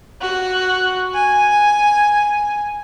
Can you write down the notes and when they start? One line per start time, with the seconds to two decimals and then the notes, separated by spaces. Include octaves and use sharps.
0.22 F#4
1.14 G#5